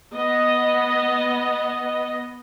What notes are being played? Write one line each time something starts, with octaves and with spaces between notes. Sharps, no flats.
B3 D#5